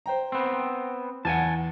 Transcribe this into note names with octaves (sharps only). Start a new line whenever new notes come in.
C5 G5 A#5
B3 C4
E2 F#5 G#5 A5